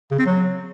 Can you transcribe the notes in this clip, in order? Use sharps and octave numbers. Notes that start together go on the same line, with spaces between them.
C#3
C4
F#3